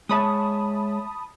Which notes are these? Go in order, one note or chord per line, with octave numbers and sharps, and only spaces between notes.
G#3 C#5 E5 A5 B5 D#6